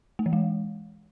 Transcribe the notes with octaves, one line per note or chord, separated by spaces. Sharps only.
A3
E3
G#3